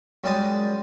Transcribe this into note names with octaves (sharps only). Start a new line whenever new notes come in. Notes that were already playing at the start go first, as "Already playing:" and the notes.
F#2 G3 G#3 A5 D#6